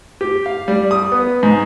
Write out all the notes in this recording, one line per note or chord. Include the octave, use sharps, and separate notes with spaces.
G4
F5
G3
D#6
B3
G#2